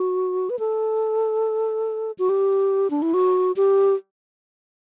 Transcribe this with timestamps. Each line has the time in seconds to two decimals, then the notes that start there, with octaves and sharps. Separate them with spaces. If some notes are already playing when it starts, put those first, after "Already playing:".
Already playing: F#4
0.50 B4
0.59 A4
2.19 F#4
2.29 G4
2.90 D4
3.02 E4
3.14 F#4
3.56 G4